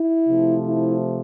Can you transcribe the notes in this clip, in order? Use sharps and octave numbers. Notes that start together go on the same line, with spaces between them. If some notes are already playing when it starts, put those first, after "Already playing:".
Already playing: E4
C3 F3 A3
E4